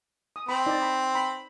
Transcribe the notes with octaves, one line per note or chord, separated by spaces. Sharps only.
D#6
C4 B5
D#4 D5
B5
B5